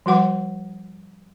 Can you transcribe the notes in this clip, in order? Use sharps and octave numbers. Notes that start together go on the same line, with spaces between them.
F3 G3 F#4 B4 F#5 D6